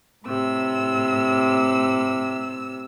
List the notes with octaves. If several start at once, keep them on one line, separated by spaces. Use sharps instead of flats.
A2 C3 E6